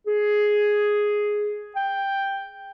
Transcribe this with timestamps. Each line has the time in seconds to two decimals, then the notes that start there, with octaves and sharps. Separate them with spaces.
0.07 G#4
1.76 G5